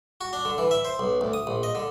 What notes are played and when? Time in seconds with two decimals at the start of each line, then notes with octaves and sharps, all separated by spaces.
0.21 F#4
0.33 D4
0.45 D3
0.58 E3
0.71 E5
0.85 C5
0.99 B1
1.21 D2
1.33 D#6
1.47 A#1
1.63 D#5
1.75 D3